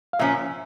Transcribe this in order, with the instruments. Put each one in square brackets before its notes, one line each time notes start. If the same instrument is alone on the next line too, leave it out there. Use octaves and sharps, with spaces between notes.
[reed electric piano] F5
[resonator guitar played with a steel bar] A#2 F3 C#4 [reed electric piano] E5